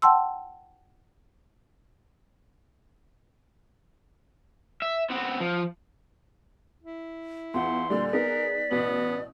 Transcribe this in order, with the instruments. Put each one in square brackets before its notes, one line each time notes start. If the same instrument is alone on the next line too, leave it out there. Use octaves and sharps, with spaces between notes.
[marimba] F#5 G5 A5 C6 E6
[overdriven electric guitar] E5
B3 C4
F3
[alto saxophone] E4
[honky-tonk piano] E2 F4 [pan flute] F#5 [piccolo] C6
[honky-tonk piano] A#2 D3 G3 [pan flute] D5
[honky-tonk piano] B3 D#4 G#4 [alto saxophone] A#4 [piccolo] B6
[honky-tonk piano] A1 B2 F#7 [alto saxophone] B3